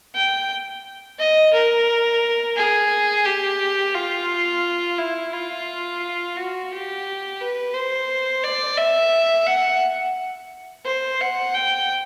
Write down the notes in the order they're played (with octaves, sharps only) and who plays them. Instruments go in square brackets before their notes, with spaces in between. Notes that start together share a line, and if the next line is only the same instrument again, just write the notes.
[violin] G5
D#5
A#4
G#4
G4
F4
E4
F4
F#4
G4
B4
C5
D5
E5
F#5
C5
F#5
G5